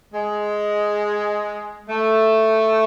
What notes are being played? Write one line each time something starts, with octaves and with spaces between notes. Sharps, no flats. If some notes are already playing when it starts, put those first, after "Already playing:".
G#3
A3